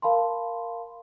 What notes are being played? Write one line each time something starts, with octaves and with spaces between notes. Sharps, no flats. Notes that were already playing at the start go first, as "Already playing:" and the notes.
A#4 F5 A5 B5 C6